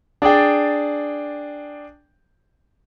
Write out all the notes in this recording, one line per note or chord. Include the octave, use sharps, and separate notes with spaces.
D4 G#4 D5 G5